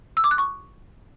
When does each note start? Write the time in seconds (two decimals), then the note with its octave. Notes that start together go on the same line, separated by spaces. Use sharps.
0.17 E6
0.24 D6
0.31 F#6
0.38 C#6